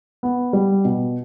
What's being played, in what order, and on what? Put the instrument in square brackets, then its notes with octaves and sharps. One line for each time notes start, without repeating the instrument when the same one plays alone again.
[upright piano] B3
G3
B2